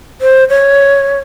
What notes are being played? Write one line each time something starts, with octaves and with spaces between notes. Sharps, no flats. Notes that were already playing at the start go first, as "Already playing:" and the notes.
C5
C#5